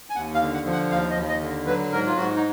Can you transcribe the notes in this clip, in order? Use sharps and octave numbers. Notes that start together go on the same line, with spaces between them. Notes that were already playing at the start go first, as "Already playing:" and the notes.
G#5
D#2 F#5
F5
D3
F#5
F3
F#5
D#2 F5
D#5
D#2
D#5
D3
F#3 B4
G#2 A#4
F4
G#2 F#4
D#4